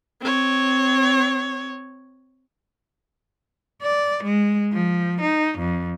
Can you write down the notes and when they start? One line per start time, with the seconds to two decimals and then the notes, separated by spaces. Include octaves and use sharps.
0.21 C4 C#5
3.82 D5
4.24 G#3
4.73 F3
5.21 D#4
5.59 F2